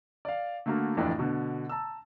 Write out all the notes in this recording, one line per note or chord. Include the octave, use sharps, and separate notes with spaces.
D5 F5
D3 A3 A#3 F#4 A#4
D1 F2 E3 D4 E4 D5
B2 D3
A5 A#5 E6